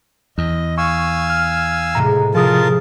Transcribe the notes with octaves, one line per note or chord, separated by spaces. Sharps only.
E2 D#5
F5 G#5 C#6 E6
F6
A2 C3 G#3 A#5
C3 F3 F4 G#4 A#4 A5 D#6